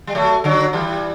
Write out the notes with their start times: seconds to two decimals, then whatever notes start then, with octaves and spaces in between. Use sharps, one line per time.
0.07 G3
0.15 F#3 A3
0.44 D3 F#3
0.73 E3 G3